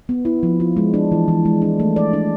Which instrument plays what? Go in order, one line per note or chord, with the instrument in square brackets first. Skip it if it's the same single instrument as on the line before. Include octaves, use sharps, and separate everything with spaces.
[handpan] B3
E4
F3
F4
G#3
D4
E3
E3
G#3
D4
A3
D5
D4